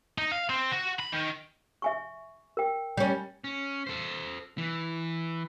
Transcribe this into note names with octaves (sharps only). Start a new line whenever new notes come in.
D#4
F5
C4
F#4
B5
D#3
E5 G#5 C#6
A#4 G5
G3 C#4
C#4
A4 C5
E3